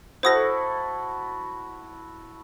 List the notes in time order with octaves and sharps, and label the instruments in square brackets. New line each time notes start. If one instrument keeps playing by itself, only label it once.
[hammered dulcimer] E4 F#4 A4 [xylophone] C5 D#6 A#6